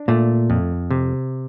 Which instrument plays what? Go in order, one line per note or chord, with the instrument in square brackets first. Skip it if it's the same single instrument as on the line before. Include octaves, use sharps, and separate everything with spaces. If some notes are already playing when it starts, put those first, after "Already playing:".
Already playing: [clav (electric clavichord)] D4
[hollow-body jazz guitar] A#2 [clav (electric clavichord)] A3
[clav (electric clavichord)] F2
C3